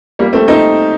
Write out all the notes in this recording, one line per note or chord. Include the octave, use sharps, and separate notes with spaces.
G3 A#3
A3 C4
C4 D#4